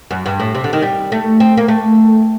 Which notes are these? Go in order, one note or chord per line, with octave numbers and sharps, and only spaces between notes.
F#2
G2
A2
C3
D3
D#3
G3
A3
C4
A#3
A3